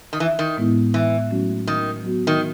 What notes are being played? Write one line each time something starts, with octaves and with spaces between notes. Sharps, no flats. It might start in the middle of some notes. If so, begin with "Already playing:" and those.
D#3
E3
D#3
A2 G#3 B3 E4
E3
F#3 A3 C#4 F#4
D#3
F#3 B3 F#4
D#3